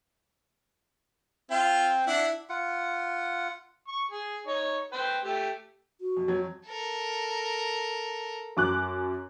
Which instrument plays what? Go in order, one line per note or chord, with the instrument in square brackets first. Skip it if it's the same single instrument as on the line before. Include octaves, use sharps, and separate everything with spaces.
[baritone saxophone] C4 [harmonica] F4
[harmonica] D4 F#5 [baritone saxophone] E4
[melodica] F4 F#5
[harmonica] C#6
G#4
D#4 C#5
B4 C5 G5
A3 G4
[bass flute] F#4
[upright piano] F2
F2 F#3 G#6
[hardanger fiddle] A4 A#4
[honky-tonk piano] F#2 D6 F#6